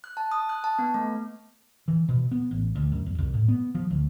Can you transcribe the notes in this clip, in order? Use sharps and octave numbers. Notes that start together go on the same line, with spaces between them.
F#6
A5
D#6
F#6
A5
B3
A3
E3
B2
B3
A1
D2
F#2
E2
C2
A2
B3
F3
D2